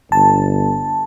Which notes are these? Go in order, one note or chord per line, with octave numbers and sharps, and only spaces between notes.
G1 A5